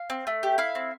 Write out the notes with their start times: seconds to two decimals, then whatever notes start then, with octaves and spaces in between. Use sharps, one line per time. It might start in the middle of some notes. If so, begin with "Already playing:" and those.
Already playing: F5
0.10 C4
0.27 A3
0.43 G4
0.58 E4 F5
0.75 C4